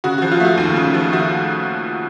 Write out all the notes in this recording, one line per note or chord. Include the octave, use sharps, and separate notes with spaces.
C#3 F#4
F3 F#4
F4
A3 F#4
D#2
C#3
F3
A3 F#4